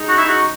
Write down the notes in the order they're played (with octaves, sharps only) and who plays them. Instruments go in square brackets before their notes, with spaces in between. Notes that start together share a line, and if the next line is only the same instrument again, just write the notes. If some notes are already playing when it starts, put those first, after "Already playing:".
Already playing: [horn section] C#3 G#3 D#4
[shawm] F#4
E4
F#4